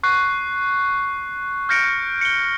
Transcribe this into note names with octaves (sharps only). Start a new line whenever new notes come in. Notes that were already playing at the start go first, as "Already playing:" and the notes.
C#6 F#6 C7
F6 G6 A#6 C#7 D7
C#7 G7